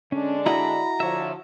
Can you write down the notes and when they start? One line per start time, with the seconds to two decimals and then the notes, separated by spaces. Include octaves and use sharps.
0.12 D3 G#3 C#4 D4
0.46 E4 F#4 D#5 A#5 B5
1.00 D3 F3 C#5 E5